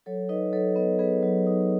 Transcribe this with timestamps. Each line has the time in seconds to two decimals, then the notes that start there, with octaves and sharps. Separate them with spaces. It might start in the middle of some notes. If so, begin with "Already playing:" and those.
0.06 F#3 A4 C#5
0.29 D#4 B4 D#5
0.53 F#3 A4 C#5
0.76 B3 B4 D#5
0.99 B3 G#4 B4
1.23 F#3
1.47 D#4